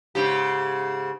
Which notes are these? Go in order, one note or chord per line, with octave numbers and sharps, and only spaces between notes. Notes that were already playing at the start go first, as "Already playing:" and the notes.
G#2 C#3 G4